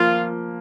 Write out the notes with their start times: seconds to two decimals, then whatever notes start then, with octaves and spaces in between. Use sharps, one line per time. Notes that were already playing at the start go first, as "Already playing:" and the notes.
Already playing: F3 A#3 F4